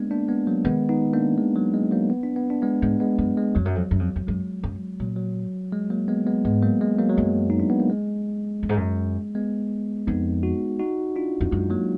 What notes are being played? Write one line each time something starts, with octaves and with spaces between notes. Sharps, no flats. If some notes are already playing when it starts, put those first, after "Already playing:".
Already playing: G#3 A#3 B3 D4
A#3 D4
G#3 B3
F#3 A#3
D#3 G#3 B3
B3 D#4
A#3 D4
G#3
F#3
G#3
F#3 A#3
B3
D4
B3
D4
G#3 B3
G#2 G#3 B3
G#3 B3
F#2 G#3
G#3
F2 F#3
F#2
F2
F#2
F2
F2
F#2 G#3
F#2
A#2 F#3
F#3
G#3
F#3 A#3
G#3 B3
G#3 B3
G#2 G#3 B3
F#3 A#3
G#3
F#3 A#3
F#3
F#2 G#3
D#4
D4
B3
A#3
G#3
F#2
G#2
F#2
G#3 B3
F2 B3 D#4
D#4 F#4
D#4 F#4
D4 F4
F2
F#2 G#3
F#3 A#3